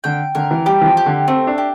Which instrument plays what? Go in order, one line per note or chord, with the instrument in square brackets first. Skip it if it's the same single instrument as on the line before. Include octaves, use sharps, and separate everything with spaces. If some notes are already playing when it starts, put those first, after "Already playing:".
[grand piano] D3 [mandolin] G5
[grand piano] D3 [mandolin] A#4
[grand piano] E3
[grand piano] G3 [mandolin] G4
[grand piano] E3
F3
[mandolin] G4
[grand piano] D3
[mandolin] A3 [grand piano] C4
[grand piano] D4
[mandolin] G4